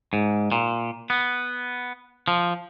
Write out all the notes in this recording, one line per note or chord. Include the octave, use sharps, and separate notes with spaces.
G#2
A#2
B3
F3